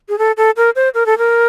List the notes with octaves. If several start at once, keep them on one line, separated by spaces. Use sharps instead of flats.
G#4
A4
A4
A#4
C5
A#4
A4
A#4